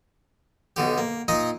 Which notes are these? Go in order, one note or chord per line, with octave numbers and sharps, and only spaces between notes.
B1 B2 D3 G4
A#3
A#2 D#4 D#5 D#6